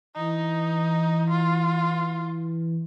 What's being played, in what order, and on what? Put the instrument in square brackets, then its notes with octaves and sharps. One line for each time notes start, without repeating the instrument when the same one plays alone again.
[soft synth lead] E3 [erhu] D#4
[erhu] F4